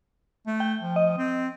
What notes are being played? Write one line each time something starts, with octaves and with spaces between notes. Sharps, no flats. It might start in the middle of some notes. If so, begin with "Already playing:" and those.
A3
G5
F3
D#5
C4